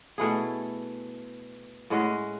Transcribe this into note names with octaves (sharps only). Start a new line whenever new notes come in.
B2 A3 E4 G#4
A2 G#3 C#4 F#4